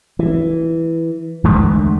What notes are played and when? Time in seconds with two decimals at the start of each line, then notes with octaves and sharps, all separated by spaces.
0.19 E3
1.44 E2 D3 G#3 A3